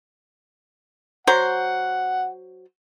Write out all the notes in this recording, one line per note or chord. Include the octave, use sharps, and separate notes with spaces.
F#3 C5 F#5